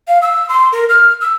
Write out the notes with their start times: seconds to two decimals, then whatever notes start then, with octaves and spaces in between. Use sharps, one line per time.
0.08 F5
0.22 E6
0.49 C6
0.72 A#4
0.89 F6
1.21 E6